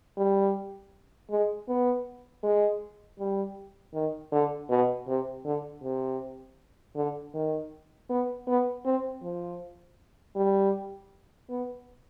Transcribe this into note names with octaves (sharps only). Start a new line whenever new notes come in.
G3
G#3
B3
G#3
G3
D#3
D3
B2
C3
D3
C3
D3
D#3
B3
B3
C4
F3
G3
B3